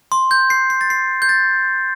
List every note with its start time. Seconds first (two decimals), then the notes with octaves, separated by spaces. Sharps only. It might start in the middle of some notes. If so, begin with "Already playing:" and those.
0.12 C6
0.31 G6
0.50 C7
0.70 C7
0.81 A6
0.90 C7
1.22 G6
1.29 A6